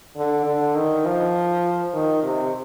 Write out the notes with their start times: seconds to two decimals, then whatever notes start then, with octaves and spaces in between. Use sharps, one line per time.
0.16 D3
0.46 D3
0.75 D#3
1.05 F3
1.93 D#3
2.23 C3